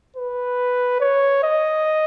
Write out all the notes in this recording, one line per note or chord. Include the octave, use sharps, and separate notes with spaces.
B4
C#5
D#5